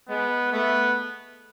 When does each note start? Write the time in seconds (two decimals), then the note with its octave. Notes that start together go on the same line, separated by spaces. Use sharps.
0.09 G#3 B3
0.52 A3 B3